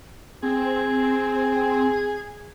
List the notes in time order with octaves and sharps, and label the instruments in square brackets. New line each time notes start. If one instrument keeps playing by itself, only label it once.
[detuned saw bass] C4 [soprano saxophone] G#4